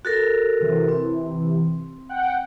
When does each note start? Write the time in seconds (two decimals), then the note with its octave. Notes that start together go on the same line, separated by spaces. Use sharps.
0.05 F#4 A4 A#4
0.60 C3 E3
0.89 C4
2.09 F#5 G5